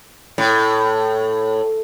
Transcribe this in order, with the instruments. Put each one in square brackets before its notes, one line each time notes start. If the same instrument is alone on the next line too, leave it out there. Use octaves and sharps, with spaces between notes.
[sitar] A2